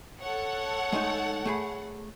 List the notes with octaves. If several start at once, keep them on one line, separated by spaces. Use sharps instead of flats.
A4 C#5 F#5
G#3 A3 D#4
A3 G#4 B5